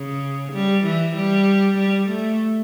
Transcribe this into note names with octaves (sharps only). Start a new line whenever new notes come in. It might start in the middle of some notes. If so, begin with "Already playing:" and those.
Already playing: C#3
G3
E3
G3
G3
A3